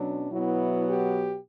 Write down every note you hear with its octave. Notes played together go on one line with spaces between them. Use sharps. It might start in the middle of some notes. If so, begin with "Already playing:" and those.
Already playing: B2 F#3 C#4 D4
B2 F#3 B3 E4
G4